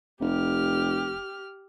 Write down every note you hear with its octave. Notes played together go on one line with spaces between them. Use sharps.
F1 G4 F6